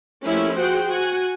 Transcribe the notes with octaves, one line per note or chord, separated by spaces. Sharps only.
F3 A3 A#3 C#4 E4 G4
F#4 G#4 C5 F#5 G5
F#4 F#5 G#5